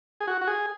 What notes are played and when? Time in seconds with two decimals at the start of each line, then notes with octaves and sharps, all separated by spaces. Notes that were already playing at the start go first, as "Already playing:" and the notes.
0.21 G#4
0.27 F#4
0.41 F#4
0.47 G#4